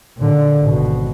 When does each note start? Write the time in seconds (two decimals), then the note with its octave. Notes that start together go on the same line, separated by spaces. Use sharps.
0.17 A#2 D3
0.59 G#1 B2